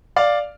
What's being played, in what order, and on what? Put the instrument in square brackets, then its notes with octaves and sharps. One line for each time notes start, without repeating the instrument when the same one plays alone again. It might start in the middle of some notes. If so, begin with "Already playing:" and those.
[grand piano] D5 F5